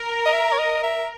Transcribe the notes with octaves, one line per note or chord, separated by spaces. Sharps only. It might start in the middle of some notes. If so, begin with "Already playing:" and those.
Already playing: A#4
D#5
E5
C#5
D#5
E5